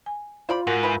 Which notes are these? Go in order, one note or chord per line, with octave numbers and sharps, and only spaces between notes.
G#5
F4 C5 D5 B5
G#2 F#4 A#4 F#5
E3 B4